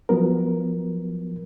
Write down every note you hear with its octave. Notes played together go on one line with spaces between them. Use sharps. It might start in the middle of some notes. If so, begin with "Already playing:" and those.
F3 F#3 B3 A#4